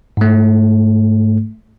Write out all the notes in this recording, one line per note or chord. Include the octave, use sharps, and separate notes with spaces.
G#2 A3